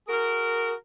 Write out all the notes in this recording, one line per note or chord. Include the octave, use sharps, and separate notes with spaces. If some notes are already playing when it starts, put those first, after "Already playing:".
F#4 G#4 A#4